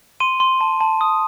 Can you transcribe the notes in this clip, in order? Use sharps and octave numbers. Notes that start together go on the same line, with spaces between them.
C6 D#7
C6
A5
A5
D#6